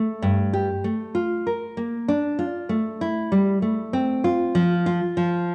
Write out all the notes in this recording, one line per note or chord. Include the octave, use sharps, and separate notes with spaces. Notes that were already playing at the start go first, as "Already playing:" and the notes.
Already playing: A3
G2
G4
A3
F4
A#4
A#3
D4
F4
A3
E4
G3
A3
C4
F4
F3
F4
F3